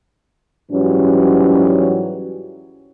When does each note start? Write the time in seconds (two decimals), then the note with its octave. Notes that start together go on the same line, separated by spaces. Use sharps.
0.72 G#2 E3 F#3 G3 C#4